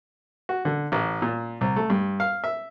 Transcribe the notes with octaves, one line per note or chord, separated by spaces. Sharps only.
F#4
D3
A1
A#2
C2
A3
G2
F5
E5